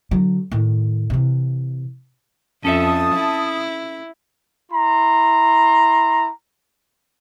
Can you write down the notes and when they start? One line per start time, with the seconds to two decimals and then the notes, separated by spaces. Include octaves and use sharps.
0.11 D3 F#3
0.51 A2 D#3
1.10 C3 E3
2.65 F2 C#4 A4 E5 A5 D#6
3.15 E4
4.71 E4 A#5 C6